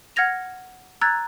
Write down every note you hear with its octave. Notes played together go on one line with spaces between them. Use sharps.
F#5 F6 G#6 A#6 F7
A#5 E6 F#6 G#6 A6